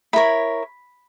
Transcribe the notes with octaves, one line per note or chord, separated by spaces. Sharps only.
E4 A#4 C#5 B5